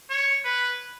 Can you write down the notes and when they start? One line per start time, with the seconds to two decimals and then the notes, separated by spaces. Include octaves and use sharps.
0.10 C#5
0.45 B4